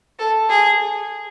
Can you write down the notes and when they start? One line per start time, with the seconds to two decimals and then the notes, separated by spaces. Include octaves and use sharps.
0.19 A4
0.49 G#4